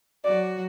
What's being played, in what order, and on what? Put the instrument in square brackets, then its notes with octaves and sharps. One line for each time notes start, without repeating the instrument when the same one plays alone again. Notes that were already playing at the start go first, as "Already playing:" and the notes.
[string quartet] F#3 F#4 [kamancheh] D5